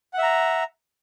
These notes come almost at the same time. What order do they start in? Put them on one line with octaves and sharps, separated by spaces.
F#5 E5 A#5